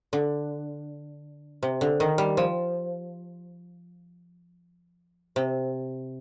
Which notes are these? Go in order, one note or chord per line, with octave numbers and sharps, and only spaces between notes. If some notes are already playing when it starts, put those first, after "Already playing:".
D3
C3
D3
D#3
G3
F3
C3